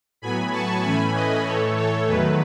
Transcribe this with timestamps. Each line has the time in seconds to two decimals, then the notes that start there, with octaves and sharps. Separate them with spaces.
0.22 A2 F#3 B3 G#5 B5
0.52 A5 C#6
0.83 A2 E3 A3 C#4 G#5 B5
1.14 B4 D#5
1.45 A2 E3 A3 A4 C#5
1.76 A4 C#5
2.07 E2 D#3 F#3 A3 B4